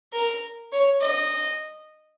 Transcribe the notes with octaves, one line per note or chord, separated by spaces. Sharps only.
A#4
C#5
D#5